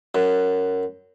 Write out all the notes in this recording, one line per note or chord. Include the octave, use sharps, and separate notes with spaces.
F#2